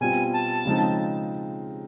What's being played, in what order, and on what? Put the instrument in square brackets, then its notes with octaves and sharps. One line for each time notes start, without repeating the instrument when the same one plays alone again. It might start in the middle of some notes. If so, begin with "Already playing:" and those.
[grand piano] B2 G3 C4 F4 [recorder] G#5
[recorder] A5
[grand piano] C#3 F3 G#3 C4 D#4